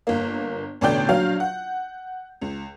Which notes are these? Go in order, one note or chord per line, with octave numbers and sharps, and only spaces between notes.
G1 A#3
A1 B2 D3 D5 G5 G6
A#1 F#3 D4 F5
F#5
C#2